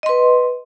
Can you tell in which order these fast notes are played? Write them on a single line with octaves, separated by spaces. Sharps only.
D#5 C6 B4